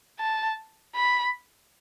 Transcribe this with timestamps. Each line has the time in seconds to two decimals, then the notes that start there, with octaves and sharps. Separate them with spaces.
0.20 A5
0.96 B5